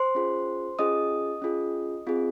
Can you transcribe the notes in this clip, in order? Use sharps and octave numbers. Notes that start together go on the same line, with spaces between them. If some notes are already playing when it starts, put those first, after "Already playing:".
Already playing: C5 C6
C#4 F4 G#4
C#4 F4 G#4 D#5 D#6
C#4 F4 G#4
C4 F4 G#4